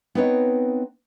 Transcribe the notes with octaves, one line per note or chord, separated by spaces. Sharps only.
B3 C4 D#4 B4 C#5 D#5